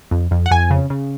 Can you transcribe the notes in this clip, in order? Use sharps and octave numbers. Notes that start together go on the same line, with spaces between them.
F2
F2
F#5
F2 G#5
C#3
C#3